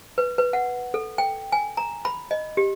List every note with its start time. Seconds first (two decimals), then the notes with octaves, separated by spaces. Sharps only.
0.18 B4
0.38 B4
0.53 F#5
0.94 A4
1.18 G5
1.52 G#5
1.77 A#5
2.05 B5
2.31 D#5
2.57 G4